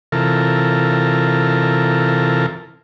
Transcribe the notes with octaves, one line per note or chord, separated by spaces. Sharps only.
C3 E3 F4 A4 A#4